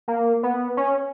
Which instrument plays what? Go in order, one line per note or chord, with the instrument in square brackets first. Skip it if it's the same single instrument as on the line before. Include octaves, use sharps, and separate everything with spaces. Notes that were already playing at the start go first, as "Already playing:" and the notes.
[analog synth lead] A#3
B3
C#4